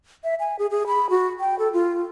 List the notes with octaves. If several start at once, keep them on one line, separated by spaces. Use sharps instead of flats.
E5
G#5
G#4
G#4
B5
F#4
G5
A4
F4